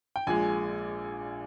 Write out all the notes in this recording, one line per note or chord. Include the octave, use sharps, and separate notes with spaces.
G5
A#1 A#2 G#3 G#5